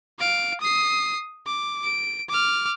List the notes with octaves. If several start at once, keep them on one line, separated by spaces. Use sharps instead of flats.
F5 D7
D#6 C7
D6
D7
D6 F6